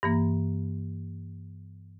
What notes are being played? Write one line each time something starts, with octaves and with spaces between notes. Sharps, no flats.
G2 E3 A#3